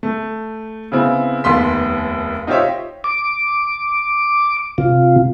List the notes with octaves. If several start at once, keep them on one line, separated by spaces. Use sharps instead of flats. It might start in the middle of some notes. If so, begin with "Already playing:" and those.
A3
C#3 B3 C4 E4
F1 D#2 B3 C6 B6
D#4 F4 G4 C5 C#5 E5
D6
C3 F4